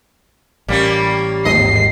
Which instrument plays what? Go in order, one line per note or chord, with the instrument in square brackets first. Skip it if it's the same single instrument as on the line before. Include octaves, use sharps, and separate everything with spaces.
[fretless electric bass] A1 [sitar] G3 A#3 C#4
[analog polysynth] G#1 D#2 [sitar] D#5 [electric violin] C7